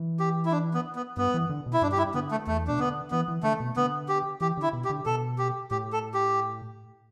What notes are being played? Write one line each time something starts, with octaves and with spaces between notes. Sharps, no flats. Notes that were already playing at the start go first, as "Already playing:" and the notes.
Already playing: E3
G4
E4
D4
B3
B3
G2 B3
E3
D3
B2
E4
G2 D4
G4
E4
D3 B3
A3
E2 A3
B2 D4
D3 B3
E3 B3
E3
D3 A3
B2
D3 B3
G4
E3 G4
D3
E4
B2
G4
D3
B2 A4
G4
A2 G4
A4
G4